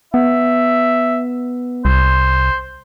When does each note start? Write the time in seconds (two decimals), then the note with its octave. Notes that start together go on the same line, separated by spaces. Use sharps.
0.14 B3 E5
1.85 C2 C5